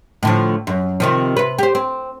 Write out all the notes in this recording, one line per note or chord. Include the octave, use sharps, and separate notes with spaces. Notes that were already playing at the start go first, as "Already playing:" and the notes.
A2 D3 F3
F#2
C3 D#3 F3
C3 B4
G4 C5
C4